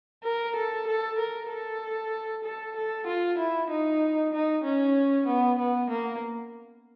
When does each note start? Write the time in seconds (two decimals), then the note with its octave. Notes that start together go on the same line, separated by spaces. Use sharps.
0.24 A#4
0.56 A4
0.87 A4
1.18 A#4
1.50 A4
2.44 A4
2.76 A4
3.07 F4
3.38 E4
3.71 D#4
4.33 D#4
4.65 C#4
5.27 B3
5.59 B3
5.90 A#3